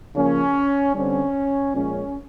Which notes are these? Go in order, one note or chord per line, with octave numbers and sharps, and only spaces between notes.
C#3 F3 A#3 C#4
D3 G3 C4 C#4
A#2 F3 G#3 C#4